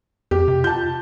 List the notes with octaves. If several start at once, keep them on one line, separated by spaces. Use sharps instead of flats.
F2 G4
C3
F4 A5 G6